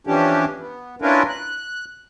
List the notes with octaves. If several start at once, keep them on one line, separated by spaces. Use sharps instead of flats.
E3 F3 C#4 D4 G4
B3
C#4 D4 E4 F4 A#4 B4
F#6